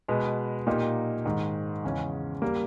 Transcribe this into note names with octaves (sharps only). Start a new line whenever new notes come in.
B2 G#3 B3
A#2 A#3 D#4 G4
G#2 D#3 G#3
E2 C#3 G#3 C#4
G3 A#3